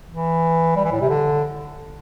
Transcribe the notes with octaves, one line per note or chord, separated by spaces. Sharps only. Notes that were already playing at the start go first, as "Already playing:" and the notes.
E3
G3
E3
A2
C3
D3